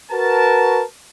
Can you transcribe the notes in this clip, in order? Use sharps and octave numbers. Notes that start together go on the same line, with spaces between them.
F#4 A#4 B4 A5